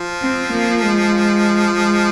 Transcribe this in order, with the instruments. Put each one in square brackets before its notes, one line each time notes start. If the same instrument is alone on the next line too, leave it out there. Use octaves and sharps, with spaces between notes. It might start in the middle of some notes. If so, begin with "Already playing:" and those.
Already playing: [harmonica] F3
[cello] C4
A#3
G#3
G#3